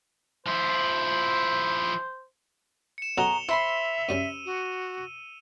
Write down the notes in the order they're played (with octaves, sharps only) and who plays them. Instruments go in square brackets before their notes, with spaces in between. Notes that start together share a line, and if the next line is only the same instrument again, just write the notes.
[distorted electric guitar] F3 E4 [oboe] C5
[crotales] C#7 E7
[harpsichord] B2 F#3 A4 [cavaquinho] F#4 G#4 A#5 [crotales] F7 G7
[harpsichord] E4 [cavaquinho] C5 B5 C6 [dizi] E5 [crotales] E6
[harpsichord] F#2 G3 C#4 [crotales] D#7
[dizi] F#4